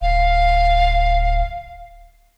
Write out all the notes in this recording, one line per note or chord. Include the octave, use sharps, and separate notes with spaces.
D1 F5